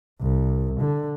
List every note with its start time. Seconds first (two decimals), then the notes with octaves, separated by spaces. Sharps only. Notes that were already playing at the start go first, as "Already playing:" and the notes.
0.22 C2
0.81 D3